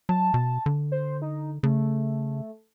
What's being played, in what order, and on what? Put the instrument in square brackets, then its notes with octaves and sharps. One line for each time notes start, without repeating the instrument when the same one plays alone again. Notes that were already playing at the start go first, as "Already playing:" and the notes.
[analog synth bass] F#3 [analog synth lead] A5
[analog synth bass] B2
D3
[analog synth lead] C5
D#4
[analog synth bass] C#3 [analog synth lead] A3